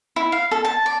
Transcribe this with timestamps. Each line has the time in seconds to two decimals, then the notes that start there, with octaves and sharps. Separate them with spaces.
0.16 E4
0.32 F5
0.51 A4
0.65 A5
0.86 D5